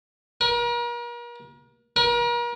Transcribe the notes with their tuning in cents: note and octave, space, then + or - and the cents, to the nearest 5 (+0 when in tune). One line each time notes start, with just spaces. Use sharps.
A#4 +40
A#4 +40